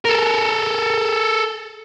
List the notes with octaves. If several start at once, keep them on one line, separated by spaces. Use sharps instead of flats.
A4 A#4